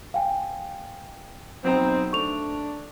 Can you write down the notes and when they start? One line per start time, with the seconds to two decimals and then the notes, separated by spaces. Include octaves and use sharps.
0.14 F5 G5 G#5
1.64 B1 C4 D#4 A#5
2.13 A3 D4 C#6 F7